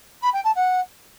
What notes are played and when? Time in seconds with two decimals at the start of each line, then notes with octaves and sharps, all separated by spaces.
0.21 B5
0.33 G5
0.44 A5
0.55 F#5